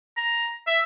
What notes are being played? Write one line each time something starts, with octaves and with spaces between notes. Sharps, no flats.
A#5
E5